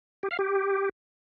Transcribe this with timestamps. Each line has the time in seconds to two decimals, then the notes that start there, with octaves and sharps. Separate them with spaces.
0.23 G4
0.31 F5
0.39 G4